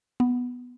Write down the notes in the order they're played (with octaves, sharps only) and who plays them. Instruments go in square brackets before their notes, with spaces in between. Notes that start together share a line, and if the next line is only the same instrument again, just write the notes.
[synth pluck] B3